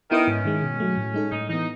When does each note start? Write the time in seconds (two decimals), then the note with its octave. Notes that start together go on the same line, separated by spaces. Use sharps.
0.11 D#3 B3 E4 B4 D#5
0.28 G#2 C#4
0.45 D#3 G#3
0.63 B2
0.80 F#3 A3
0.97 A2
1.14 G#3 D#4 A4
1.32 A2 D#4
1.49 E3 B3 D#4